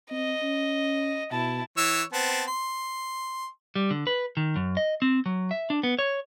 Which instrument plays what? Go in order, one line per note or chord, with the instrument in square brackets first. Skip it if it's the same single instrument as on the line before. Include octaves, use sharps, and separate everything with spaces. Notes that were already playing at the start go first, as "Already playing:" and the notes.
[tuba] C4 [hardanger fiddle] D#5
[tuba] C#4
[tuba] B2 [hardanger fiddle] E4 A5
[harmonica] E3 C#5 E6
B3 C4 A5
C6
[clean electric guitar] G3
D3
B4
D#3
F#2
D#5
C4
F#3
E5
D4
B3
C#5